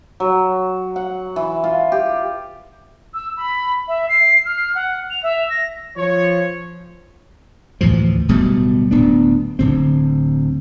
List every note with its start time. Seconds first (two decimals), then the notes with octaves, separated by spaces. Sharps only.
0.20 F#3
0.96 F#5
1.36 E3
1.64 F4
1.92 G4
3.14 E6
3.37 B5
3.88 E5
4.09 C7
4.45 F6
4.75 F#5
5.11 F7
5.23 E5
5.50 A#6
5.96 F3 C#5
7.81 D2 A2 E3 F3
8.28 D1 B2 G3 A3
8.91 D1 B3 D4
9.59 D1 D3 C4